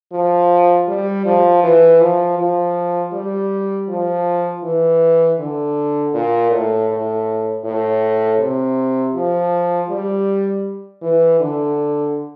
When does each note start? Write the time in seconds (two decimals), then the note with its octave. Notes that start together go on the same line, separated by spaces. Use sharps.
0.12 F3
0.88 G3
1.25 F3
1.63 E3
2.00 F3
2.38 F3
3.13 G3
3.88 F3
4.63 E3
5.39 D3
6.13 A#2
6.51 A2
6.89 A2
7.64 A2
8.40 C3
9.15 F3
9.89 G3
11.02 E3
11.40 D3